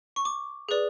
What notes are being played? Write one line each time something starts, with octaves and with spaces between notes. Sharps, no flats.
C#6
D6
G#4 B4 D5